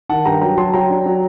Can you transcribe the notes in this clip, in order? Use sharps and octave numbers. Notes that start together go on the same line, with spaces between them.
D#3 F#5 A5
G2 G5 A#5
F#3 G5 A#5
F#3 A5 C6
F#3 G5 A#5
D4
F#3